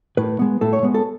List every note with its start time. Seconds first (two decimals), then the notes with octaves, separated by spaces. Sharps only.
0.17 A2 B4
0.39 G#3 B3
0.61 A2 A4
0.73 C#5
0.83 G#3 B3
0.94 A4